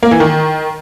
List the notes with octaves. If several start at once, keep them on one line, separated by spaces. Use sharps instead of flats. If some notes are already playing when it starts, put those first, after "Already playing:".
A#3
E3
D#3